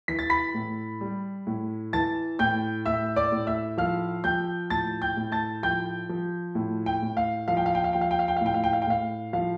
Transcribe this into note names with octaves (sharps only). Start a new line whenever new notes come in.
E3 B6
A6
B5 B6
A2
G3
A2
E3 A5 A6
A2 G5 G6
A2 E5 E6
D5 D6
A2
E5 E6
F3 F5 F6
F3 G5 G6
A2 A5 A6
G5 G6
A2
A5 A6
F3 G5 G6
F3
A2
G5
A2
F5
F3 F5
G5
F5
G5
F5
F3 G5
F5
G5
F5
G5
F5
A2
G5
F5
G5
F5
G5
A2 F5
F3 F5